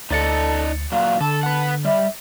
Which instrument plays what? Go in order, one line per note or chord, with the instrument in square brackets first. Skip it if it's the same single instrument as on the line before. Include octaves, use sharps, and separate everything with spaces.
[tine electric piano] D2 A6 C#7 [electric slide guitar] D#4 D5 D#5 [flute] A4
[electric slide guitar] A#2 F#3 [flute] F5
[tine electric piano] D3 [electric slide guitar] A4 [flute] A5
[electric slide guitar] B4 F#5
[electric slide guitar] G3 [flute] E5